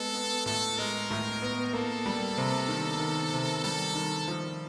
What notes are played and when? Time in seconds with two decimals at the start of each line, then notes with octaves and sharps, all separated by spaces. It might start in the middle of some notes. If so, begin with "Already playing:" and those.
Already playing: G#3 B3 A4
0.15 B3
0.46 A2 A4
0.78 G#3 A#4
1.10 A2
1.42 B3
1.73 A#3 A4
2.06 G3
2.37 C3
2.68 D#3
3.00 D#3
3.33 C3
3.64 G3 A4
3.95 D#3
4.28 F3